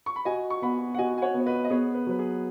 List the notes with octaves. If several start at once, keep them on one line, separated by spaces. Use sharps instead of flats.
C#6
B5
F#4 D#5 G#5
C#6
B3 F#5 B5
F#5
F#4 D#5 G#5
G#5
C#5 F#5
B3
C#5
B4 D#5
D#5
B3 G#4 C#5
B4
F#3 B4
G#4